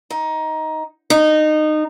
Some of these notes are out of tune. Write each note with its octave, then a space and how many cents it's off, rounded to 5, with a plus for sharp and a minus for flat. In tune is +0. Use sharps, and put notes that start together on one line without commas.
D#4 +15
D#4 -20